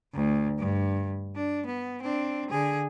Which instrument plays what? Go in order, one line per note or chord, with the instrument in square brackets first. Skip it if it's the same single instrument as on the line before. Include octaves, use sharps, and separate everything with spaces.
[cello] D2
G2
D4
B3
C4 D4
D3 G#4